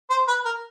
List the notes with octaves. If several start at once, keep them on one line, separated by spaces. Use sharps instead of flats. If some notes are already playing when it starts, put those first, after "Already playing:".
C5
B4
A#4